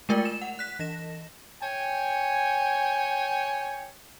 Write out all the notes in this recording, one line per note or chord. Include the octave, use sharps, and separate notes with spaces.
G#3 A3 F4 A#4 D5 G5
E7
F#5
F#6 B6
E3 A#6 E7
C#5 G5 G#5